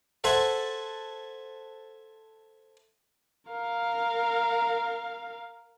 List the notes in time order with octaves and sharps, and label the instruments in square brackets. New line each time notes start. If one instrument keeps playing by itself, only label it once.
[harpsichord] A4 C5 E5 F#5 G#5 A5
[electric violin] A#4 F5